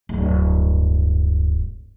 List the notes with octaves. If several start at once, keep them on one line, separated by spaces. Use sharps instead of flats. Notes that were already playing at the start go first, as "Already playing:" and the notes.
D1 G2